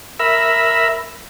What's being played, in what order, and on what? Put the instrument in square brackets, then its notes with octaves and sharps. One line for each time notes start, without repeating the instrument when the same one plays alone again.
[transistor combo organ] A#4 E5 B5